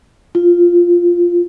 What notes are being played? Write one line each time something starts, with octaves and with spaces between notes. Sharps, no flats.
F4